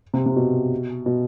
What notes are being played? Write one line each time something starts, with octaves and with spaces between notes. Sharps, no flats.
C3
C3
B2
B2